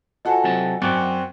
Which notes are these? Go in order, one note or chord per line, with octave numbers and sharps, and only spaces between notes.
F3 F#4 A4 D#5 F#5 G#5
C3 F#3 A5
F#2 C4 F#4 D5